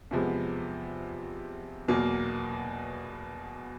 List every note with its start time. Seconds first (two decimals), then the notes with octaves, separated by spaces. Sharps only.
0.11 E2 C3 F3 G#3 B3
1.88 E2 B2 F#3 A#3